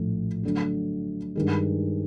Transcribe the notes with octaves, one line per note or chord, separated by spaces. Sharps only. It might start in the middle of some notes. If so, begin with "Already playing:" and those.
Already playing: A#1 A2 F3 A3
D3 F#3 A3 D4
G2 D#3 G#3